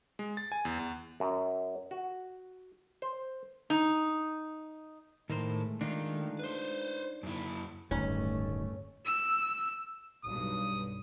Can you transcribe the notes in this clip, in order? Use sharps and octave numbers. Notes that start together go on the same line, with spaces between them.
G#3
A6
G#5
E2
E2
F#2
F#4
C5
D#4
A2 D#3 G#3 A3 A#4 C5
D#3 D4 D#4 F4
B4 C5
F#2 E4
D1 G2 D#3 A3 C#4
E6
B1 G2 D#6